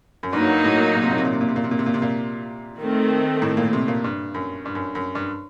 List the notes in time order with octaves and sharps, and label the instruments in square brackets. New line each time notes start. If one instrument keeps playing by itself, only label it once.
[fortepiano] F#2
[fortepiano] G2 [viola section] F#3 A#3 D#4
[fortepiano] A2
A#2
C3
A#2
C3
A#2
C3
A#2
C3
A#2
C3
A#2
C3
A#2
C3
A#2
[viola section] D#3 A3 C4
[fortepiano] A2
A#2
C3
A#2
G2
F#2
G2
F#2
F#2
G2